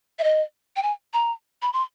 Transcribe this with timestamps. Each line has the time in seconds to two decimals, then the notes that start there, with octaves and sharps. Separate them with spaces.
0.19 E5
0.24 D#5
0.76 G5
0.83 G#5
1.14 A#5
1.62 B5
1.73 C6